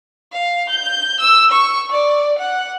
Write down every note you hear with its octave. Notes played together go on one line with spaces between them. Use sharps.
F5
G6
E6
C#6
D5
F#5